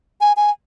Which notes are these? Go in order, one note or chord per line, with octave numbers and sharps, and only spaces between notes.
G#5
G#5